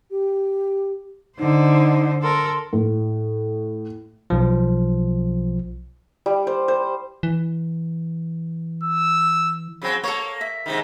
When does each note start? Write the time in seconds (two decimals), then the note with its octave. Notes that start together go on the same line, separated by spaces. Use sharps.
0.10 G4
1.38 D3 D#4 C5
2.22 A4 A#4 C6
2.73 A2
4.30 B1 F3
6.26 G3
6.47 C5
6.68 C5
7.23 E3
8.84 E6
9.82 C#3 F#3 C4
10.04 A#3 A4 C#5
10.41 E5
10.66 G#2 C3 D#3